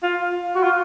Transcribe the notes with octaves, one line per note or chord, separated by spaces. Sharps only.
F4
F#4
F4